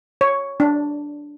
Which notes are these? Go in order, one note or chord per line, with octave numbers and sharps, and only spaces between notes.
C#5
D4